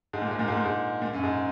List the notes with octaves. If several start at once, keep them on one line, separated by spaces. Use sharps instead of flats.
G#2
A#2
G#2
A#2
G#2
A#2
G#2
A#2
F#2
G#2